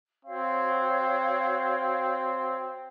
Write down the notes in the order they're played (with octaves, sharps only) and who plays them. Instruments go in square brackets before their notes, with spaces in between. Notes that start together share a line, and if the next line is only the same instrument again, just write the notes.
[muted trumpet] C4 [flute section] F#4 C#5 F5